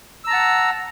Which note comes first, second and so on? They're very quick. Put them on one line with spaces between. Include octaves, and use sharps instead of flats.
E6 A#5 A5 F#5